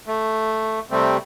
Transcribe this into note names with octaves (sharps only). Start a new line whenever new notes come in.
A3
C3 G3 A3 C4